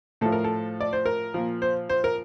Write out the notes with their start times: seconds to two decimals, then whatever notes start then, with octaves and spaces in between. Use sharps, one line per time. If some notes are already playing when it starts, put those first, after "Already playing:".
0.21 A2 F3 A4
0.32 A#4
0.44 A4
0.81 D5
0.93 C5
1.06 A#4
1.34 A#2 F3
1.62 C5
1.89 C5
2.04 A#4